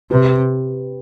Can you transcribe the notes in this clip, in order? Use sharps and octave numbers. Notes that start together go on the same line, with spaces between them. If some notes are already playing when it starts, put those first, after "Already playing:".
C3 G4 B4